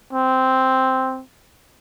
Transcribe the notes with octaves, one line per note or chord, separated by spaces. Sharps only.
C4